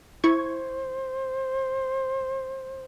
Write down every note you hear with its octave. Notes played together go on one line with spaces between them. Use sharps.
E4 C5 C#6 G#6